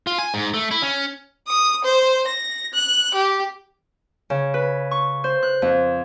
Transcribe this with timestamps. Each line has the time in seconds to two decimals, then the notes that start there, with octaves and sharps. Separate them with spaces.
0.07 F4
0.19 G#5
0.34 G#2
0.54 A3
0.71 E4
0.82 C#4
1.48 D#6
1.85 C5
2.28 A#6
2.74 F#6
3.15 G4
4.30 C#3
4.54 B4
4.91 C#6
5.24 C5
5.43 F#6
5.62 F2